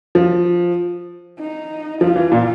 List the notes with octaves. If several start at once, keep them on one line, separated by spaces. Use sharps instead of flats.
F3
D#4
F3 F4
E3
A#2